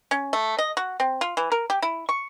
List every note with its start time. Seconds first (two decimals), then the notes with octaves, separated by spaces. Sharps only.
0.11 C#4
0.33 A3
0.58 D#5
0.77 F#4
1.00 C4
1.21 F4
1.37 E3
1.52 A#4
1.70 G4
1.82 E4
2.09 C#6